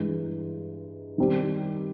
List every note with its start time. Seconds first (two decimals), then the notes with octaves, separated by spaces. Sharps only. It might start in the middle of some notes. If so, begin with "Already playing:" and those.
Already playing: G2 E3 G#3
1.18 D#3 G3 C4